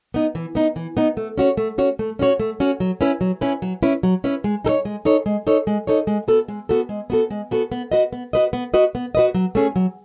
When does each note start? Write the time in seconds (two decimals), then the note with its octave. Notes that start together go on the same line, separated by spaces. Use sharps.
0.14 B3 D#4
0.35 E3
0.55 B3 D#4
0.76 E3
0.97 B3 D#4
1.17 A3
1.38 C#4 F#4 C#5
1.57 A3
1.78 C#4 F#4 C#5
1.99 A3
2.19 C#4 F#4 C#5
2.40 A3
2.60 C#4 F#4 C#5
2.80 F#3
3.01 C#4 E4 B4
3.21 F#3
3.41 C#4 E4 B4
3.62 F#3
3.83 C#4 E4 B4
4.03 F#3
4.24 C#4 E4 B4
4.44 G#3
4.65 D#4 A4
4.69 C#5
4.85 G#3
5.05 D#4 A4 C#5
5.26 G#3
5.47 D#4 A4 C#5
5.67 G#3
5.87 D#4 A4 C#5
6.07 G#3
6.28 B3 F#4 A4
6.48 G#3
6.69 B3 F#4 A4
6.89 G#3
7.10 B3 F#4 A4
7.30 G#3
7.51 B3 F#4 A4
7.72 B3
7.92 F#4 B4 D#5
8.13 B3
8.33 F#4 B4 D#5
8.53 B3
8.74 F#4 B4 D#5
8.95 B3
9.15 F#4 B4 D#5
9.35 F#3
9.55 A3 C#4 G#4
9.76 F#3